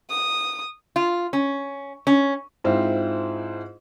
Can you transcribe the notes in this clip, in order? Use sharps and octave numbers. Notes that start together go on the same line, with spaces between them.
D#6
F4
C#4
C#4
G#2 C4 E4 F4